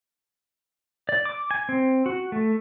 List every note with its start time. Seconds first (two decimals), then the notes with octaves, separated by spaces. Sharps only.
1.09 D5
1.25 D6
1.51 G#5
1.69 C4
2.06 F#4
2.32 A3